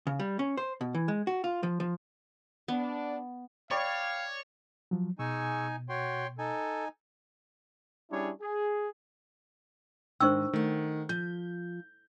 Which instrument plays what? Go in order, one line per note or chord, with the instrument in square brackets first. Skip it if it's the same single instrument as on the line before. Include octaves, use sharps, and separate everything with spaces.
[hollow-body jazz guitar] C#3
G3
C#4
C5
B2
E3
G#3
F#4
F4
F3
F3
[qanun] B3 [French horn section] D4
[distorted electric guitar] C#5 [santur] D5 [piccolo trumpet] F5 [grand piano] G5 B5 C#6
[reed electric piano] F3 F#3
[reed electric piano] B2 [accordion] D#4 G#5 [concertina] G#4 C#6 E6
[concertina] F#4 [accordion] C#5 G5 C6
[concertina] D#4 G#5 [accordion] A4
[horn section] G3 C#4 D4 E4 G#4 C#5
G#4
[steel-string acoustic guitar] G#2 D#3 [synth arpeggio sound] D4 G5 [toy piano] C5 C#6 E6
[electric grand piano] D#3 [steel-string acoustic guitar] A3 F#5
[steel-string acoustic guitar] F3 [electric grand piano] G6